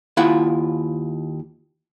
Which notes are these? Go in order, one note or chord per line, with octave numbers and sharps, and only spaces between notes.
D#2 E4 F4 F#5